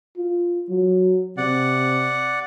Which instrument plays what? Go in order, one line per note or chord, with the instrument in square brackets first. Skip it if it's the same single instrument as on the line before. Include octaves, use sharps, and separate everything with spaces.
[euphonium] F4
F#3
[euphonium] C3 [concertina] D5 F#5